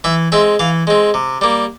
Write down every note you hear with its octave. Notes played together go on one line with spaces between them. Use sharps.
E3 E5
G#3 C4 E5
E3 F5
G#3 C4
C3
G3 A#3